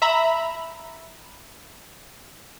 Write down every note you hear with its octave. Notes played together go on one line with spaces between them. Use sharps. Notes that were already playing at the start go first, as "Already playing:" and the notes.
E5 A#5 B5